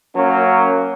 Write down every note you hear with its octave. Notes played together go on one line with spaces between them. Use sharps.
F#3 A#3 C#4